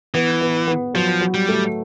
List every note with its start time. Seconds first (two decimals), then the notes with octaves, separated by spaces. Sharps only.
0.14 E3 B3
0.41 B3
0.67 B3
0.94 F3 F#3
1.21 F#3
1.34 G3
1.48 A3